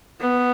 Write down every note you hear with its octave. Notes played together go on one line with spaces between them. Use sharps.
B3